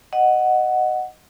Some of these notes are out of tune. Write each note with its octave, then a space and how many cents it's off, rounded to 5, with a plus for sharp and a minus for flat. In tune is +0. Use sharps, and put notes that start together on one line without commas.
D#5 -10 F#5 +0